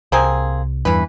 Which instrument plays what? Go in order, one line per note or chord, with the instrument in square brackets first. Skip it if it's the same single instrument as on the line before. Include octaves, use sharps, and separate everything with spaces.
[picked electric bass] C2 [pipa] A#3 C4 G#4
[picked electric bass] E2 G2 [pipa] E3 B4